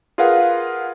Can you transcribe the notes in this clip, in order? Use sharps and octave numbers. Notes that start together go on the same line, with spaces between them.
F4 G#4 A#4 B4 F5 F#5